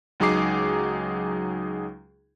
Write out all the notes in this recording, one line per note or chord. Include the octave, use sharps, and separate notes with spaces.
C#2 F#3 D#4 G#4 D6 C7